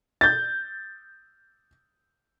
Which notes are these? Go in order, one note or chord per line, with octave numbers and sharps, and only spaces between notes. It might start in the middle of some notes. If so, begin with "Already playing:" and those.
G6 A6